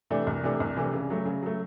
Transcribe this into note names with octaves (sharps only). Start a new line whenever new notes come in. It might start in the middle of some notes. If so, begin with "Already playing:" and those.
C3 E3 A3 D4
C2
C3 E3 A3 D4
C2
C3 E3 A3 D4
C#3
F#3 A3
C#3
F#3 A3